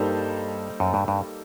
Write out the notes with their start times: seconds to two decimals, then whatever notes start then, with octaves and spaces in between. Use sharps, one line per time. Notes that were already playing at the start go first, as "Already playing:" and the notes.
Already playing: G2 G3 A#3 D#4 A4 C5
0.80 F#2
0.94 G2
1.08 G2